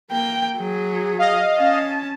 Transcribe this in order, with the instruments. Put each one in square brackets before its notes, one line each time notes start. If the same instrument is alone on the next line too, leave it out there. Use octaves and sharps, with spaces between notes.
[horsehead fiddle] A#3 G5
F#3 G#4
[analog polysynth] D#5 F5
[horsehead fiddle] C#4 A5